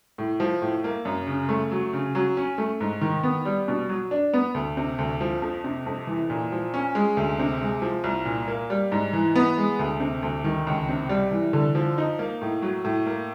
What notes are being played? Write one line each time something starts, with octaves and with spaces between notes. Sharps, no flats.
A2
F3
A2
A#3
F#2
C#3
A3
F#3
C#3
F#3
C#4
A3
G#2
D#3
B3
G3
B2
F#3
D4
B3
D2
C3
D2
F3
F2
C3
F2
E3
A#2
F3
C#4
G#3
D2
C3
G#3
F3
C2
A#2
A#3
G3
G#2
E3
B3
G#3
D2
C3
D2
D#3
C#2
C3
G3
E3
D3
F3
D#4
A#3
A2
F#3
A2
A#3